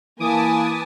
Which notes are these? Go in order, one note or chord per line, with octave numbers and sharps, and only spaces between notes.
E3 A#3 B4 G#5 A5 D6 D#6